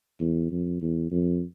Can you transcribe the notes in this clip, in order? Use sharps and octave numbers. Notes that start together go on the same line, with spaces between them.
E2
F2
E2
F2